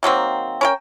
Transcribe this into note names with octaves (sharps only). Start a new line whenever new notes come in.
D#3 F#3 A#3 C4
C#4 A#4 G5